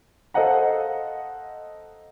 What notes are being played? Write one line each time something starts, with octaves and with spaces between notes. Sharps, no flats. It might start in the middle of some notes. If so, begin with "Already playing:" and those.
A4 C5 D#5 F5 F#5 A#5